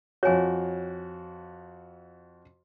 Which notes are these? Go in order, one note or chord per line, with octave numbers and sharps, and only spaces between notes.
F2 F#4 C#5 G#5